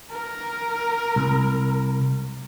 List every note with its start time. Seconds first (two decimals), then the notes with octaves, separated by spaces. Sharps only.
0.10 A#4
1.16 C2